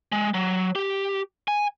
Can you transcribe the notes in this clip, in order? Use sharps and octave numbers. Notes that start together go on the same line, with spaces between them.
G#3
F#3
G4
G#5